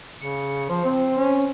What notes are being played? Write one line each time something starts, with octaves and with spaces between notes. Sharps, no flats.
C#3 C#7
F3 C5
C4
C#4